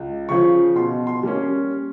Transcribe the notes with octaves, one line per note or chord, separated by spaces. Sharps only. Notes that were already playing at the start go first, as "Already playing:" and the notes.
Already playing: C#2
C#3 F3 C#6
B2 C6
C6
G3 A#3 C#4